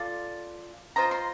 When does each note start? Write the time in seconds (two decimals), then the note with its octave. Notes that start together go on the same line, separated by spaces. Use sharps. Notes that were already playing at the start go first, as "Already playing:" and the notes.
Already playing: F4 A4 D5 D6
0.96 F4 C5 D#5 A#5
1.11 C6